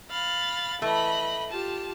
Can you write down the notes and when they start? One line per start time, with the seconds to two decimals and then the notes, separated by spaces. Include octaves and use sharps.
0.11 F5 B5 A6
0.82 E3 A3 D#5 B5
1.51 F4 G4 A5